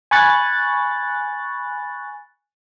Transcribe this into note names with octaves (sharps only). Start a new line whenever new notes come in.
G#5 B5 C#6 F#6 A6